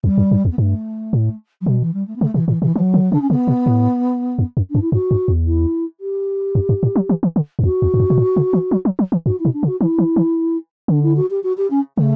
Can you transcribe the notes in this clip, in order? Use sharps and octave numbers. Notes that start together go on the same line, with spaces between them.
E2 G3
F#2
G2
E2
B3
G2 A3
A2
F#3
B2 G3
E3
G3
A3
B3
C#3 A3
B2 E3
A2 E3
B2 E3
E3 F#3
D3
C#3 D4
C#4
C#3 B3
B2
A2
F#2
F#2
G2 D4
E4
G2 F#4
G2
E2
E4
G4
F#2
G2
A2
F#3
E3
E3
D3
F#2
E2 F#4
E2
G2
F#2
B2
A2
C#3
E3
F#3
F#3
F#3
E3
G2 F#4
E4
B2
D4
C#3
F#4
E3 E4
E3
E3
D3 D4
E4
F#4
G4
F#4
G4
C#4
C#3 A3